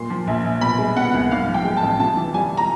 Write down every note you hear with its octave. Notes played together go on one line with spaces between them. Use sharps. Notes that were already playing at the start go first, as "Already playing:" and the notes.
Already playing: A#2 C6
F3
A#1
A#1
B2 B5
G#3
B3 F#5
C2
G#2 F5
F3
G5
G#3
A5
A1
C3 A5
E3
G3 G#5
A#5